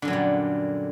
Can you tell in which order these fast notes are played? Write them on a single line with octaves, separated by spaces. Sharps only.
D3 F#2 F#3 A#2 G3